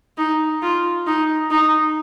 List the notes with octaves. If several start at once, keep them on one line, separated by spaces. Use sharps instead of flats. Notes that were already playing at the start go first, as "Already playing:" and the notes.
D#4
F4
D#4
D#4